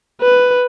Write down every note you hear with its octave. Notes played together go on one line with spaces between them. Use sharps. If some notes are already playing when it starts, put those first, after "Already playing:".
B4